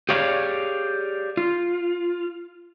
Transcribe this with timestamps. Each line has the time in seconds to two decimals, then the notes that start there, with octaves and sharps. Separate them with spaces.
0.09 G4 G#4 C#5 D5 F5
1.37 F4